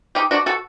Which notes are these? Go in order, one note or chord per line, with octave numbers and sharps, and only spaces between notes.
D#4 G4
D4 F#4
F#4 A4